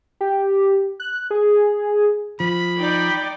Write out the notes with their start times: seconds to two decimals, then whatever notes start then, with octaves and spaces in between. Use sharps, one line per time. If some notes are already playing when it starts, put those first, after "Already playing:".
0.21 G4
1.00 F#6
1.31 G#4
2.40 F3 B5
2.77 D#4 D5 G5